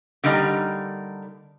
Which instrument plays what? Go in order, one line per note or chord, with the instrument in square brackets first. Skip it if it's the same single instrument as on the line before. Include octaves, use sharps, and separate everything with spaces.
[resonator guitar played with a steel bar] D3 G3 A#3 D#4